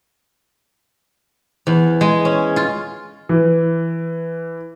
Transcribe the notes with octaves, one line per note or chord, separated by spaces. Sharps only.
E2
G#3
C#4
F4
E3